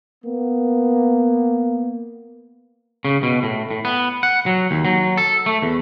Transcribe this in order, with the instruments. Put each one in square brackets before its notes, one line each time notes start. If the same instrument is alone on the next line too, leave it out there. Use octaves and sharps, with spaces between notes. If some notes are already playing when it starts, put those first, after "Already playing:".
[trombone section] A#3 B3
[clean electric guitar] C#3
B2
A2
A2
B3
F#5
F#3
D#2
F#3
A4
A3
E2